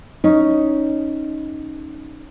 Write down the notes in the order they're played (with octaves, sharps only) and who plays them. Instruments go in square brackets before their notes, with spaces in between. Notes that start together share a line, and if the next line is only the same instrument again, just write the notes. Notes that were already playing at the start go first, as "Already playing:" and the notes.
[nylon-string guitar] C#4 D#4